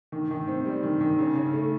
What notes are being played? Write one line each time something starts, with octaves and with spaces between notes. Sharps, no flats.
D#3
D#3
C4
G3
D#3
D#3
C#3
C#3
A3